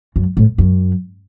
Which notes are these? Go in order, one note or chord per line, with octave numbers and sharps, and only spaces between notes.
F#2
A2
F#2